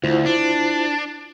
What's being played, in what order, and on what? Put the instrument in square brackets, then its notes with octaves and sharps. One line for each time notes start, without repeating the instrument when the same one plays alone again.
[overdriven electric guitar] D2 [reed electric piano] E4 F4 C5
[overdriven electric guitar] D4